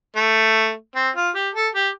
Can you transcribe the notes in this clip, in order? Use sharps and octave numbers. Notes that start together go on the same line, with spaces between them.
A3
C4
F4
G4
A4
G4